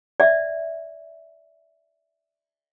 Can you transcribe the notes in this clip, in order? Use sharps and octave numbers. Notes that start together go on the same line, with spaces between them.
D5 E5